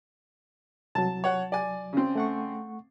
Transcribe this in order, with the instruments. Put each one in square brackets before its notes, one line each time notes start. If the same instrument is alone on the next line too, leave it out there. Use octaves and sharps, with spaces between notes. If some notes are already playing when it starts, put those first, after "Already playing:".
[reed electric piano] C2 F#3 [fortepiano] A5
[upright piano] C#5 F#5
D5 G#5
[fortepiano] C#3 C4
[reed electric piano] A3 F#5 C#6